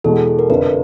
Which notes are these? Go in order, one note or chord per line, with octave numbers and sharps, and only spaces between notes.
E2 B2 G#3 A4
G#4
A4
A#4
F1 F2 D3 B4